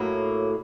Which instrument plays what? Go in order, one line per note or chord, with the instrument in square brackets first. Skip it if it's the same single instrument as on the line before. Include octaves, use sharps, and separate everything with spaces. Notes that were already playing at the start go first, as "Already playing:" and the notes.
Already playing: [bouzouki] A2 F#3 A#3